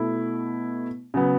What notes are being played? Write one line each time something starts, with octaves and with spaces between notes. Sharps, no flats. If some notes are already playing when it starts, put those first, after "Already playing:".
Already playing: B2 A3 E4
C#3 F#3 B3